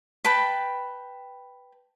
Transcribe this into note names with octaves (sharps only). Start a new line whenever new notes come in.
B4 G5 A5 B5